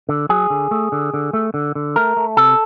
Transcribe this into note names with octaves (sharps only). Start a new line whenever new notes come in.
D3
F#3 G#4
D3
A3
D3
D3
A3
D3
D3
A3 A#4
A3
C3 A4